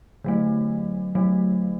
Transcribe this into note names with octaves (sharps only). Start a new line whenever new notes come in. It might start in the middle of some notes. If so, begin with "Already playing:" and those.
D3 F#3 A3
D3 F#3 A3